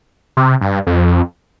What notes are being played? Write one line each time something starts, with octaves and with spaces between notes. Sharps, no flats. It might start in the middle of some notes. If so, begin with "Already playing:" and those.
C3
G2
F2